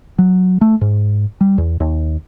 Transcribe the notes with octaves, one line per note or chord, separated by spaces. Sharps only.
F#3
A3
G#2
G3
E2
D#2